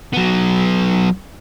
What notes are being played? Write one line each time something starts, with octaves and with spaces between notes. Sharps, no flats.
F#3 B3